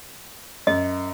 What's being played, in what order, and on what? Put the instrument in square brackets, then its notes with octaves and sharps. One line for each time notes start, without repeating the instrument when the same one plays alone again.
[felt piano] F#2 [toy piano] D#5